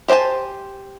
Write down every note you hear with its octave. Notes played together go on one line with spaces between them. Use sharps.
G4 C5 F#5 G#5 A5